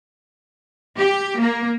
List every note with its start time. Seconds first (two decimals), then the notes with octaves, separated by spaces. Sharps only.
0.97 G4
1.39 A#3